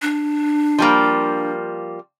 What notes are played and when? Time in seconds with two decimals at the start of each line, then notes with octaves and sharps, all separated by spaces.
0.02 D4
0.78 F3 G3 A#3